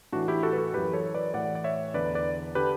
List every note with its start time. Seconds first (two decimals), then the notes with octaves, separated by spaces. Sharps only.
0.12 A2 E3 D4 F#4
0.28 E4 G4
0.43 F#4 A4
0.53 B4
0.58 F#4 A4
0.74 F#2 E3 G4 B4
0.93 A4 C#5
1.14 B4 D5
1.34 A2 E3 D5 F#5
1.55 D5
1.64 C#5 E5
1.94 E2 D3 B4 D5
2.15 B4 D5
2.55 D3 G4 B4